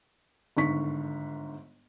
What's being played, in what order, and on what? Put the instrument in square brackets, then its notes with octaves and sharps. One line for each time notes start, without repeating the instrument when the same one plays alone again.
[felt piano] G1 G#2 D3 D#3 C#6 B6